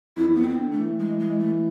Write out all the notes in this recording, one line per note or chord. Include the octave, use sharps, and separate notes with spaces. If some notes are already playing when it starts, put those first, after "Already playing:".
F2 E4
E2
F2 B3
C4
D3
D3 A3
E3
G#3
G#3
A3